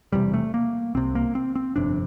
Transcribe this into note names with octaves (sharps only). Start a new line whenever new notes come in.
E1 E2 C3 G3
A3
A#3
C2 C3 C4
A#3
C4
C4
G1 F2 C3 D4